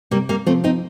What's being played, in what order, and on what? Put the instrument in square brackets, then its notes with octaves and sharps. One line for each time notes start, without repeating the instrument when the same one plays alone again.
[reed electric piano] C3 [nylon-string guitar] G3 A#3
[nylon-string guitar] G3 A#3
[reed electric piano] F3 [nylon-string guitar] A3 C4
[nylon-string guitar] C4 D#4